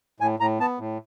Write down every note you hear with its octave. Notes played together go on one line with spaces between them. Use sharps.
A2 G#5
A2 A#5
B3 A5
A2